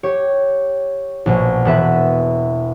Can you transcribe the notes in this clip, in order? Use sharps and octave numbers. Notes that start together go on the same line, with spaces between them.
G4 C#5
A#1 B2
E1 B3 B4 E5